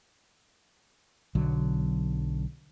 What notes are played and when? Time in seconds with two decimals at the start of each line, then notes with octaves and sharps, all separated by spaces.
1.35 B1 D3 F#3